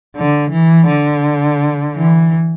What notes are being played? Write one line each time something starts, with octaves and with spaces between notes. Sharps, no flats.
D3
E3
D3
E3